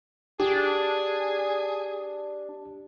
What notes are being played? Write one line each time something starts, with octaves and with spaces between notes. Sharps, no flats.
D4 G4 G#4